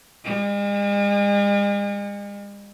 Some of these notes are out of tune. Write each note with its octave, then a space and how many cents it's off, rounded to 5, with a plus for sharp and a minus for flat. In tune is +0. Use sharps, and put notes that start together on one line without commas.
G#3 -45